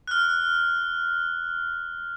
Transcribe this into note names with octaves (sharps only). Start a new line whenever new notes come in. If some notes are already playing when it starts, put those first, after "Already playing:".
F6 F#6